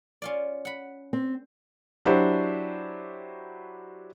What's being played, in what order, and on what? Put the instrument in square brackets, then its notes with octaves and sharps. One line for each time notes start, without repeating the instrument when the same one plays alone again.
[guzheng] C#4 F4 D5
F#5 B5
[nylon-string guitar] C4
[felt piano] F#3 D4 E4 F#4 G4 C5